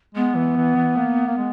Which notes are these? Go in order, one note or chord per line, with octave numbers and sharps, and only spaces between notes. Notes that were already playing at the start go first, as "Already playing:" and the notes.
G#3 B3
E3
E3
E3
A#3
A#3
G#3